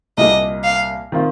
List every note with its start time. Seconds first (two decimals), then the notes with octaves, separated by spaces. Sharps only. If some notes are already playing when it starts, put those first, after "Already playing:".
0.17 C2 A#2 A#3 G4 D#5
0.64 F5
1.12 D#3 C4 F4